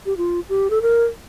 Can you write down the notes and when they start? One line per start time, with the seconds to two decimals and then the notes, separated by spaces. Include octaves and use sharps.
0.06 G4
0.17 F4
0.49 G4
0.70 A4
0.82 A#4